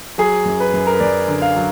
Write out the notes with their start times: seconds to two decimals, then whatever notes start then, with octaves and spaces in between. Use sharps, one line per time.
0.18 F#3 G#4
0.46 F#2
0.60 B4
0.74 F#2
0.87 A#4
0.94 B4
1.00 F#2 D5
1.28 D3
1.42 F5
1.56 F#3